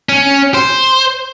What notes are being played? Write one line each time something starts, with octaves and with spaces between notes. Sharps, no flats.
C#4
C5